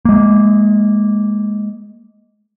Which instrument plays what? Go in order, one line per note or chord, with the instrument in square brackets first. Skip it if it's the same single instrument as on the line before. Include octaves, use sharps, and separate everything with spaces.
[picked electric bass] G#3 A#3